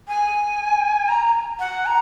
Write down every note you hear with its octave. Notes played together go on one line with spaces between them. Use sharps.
G#5
A#5
F#5
A#5